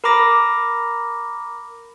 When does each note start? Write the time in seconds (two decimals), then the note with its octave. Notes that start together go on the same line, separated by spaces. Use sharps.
0.04 A#4 A#5 B5 D6 A#6